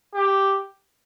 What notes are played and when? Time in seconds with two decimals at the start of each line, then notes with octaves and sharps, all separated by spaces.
0.14 G4